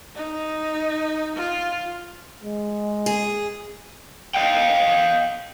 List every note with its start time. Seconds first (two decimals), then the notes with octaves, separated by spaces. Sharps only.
0.15 D#4
1.36 F4
2.44 G#3
3.06 G#4
4.34 D#5 F5 G5